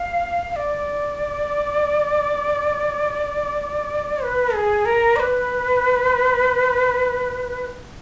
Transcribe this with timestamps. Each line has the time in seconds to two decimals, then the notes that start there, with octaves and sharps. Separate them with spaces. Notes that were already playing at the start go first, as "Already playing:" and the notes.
Already playing: F5
0.51 F5
0.56 D5
4.23 B4
4.54 G#4
4.85 A#4
5.16 D5
5.20 B4